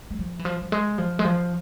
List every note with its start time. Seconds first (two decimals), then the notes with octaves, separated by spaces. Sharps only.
0.10 G#3
0.19 F3
0.39 E3
0.45 F3
0.61 F3
0.72 G#3
0.98 F3
1.19 G#3
1.24 F3